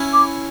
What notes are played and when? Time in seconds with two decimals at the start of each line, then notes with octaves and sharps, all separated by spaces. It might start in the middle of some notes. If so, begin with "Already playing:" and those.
Already playing: C#4 E4
0.13 D6